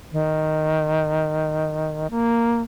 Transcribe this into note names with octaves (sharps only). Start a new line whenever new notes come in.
D#3
A#3